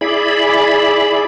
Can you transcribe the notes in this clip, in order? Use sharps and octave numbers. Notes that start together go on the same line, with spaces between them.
E4 G#4 D5 B5